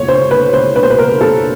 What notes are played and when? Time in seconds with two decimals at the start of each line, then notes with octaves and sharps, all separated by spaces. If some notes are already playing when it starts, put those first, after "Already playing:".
Already playing: C#5
0.08 C5
0.31 B4
0.53 C5
0.76 B4
0.83 C5
0.90 B4
0.98 A#4
1.21 A4